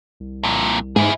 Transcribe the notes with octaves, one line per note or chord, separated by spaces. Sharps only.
C2
F2 A#2
G#2 E4 G#4